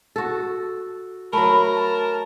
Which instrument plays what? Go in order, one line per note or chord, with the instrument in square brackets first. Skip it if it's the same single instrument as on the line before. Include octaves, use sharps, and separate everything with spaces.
[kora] F#4 A4
[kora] F#3 A3 [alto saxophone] A#4 [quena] B5
[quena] A5